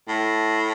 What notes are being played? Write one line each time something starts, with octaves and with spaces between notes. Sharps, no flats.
A2